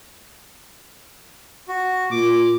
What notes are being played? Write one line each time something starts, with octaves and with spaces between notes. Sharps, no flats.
F#4
A#2 D6